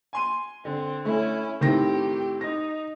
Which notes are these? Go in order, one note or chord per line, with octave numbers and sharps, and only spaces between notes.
G#5 C6 D#7
D3 C4
A3 C#4 E4
A2 D#3 C4 G4 A#6
D#4 A#6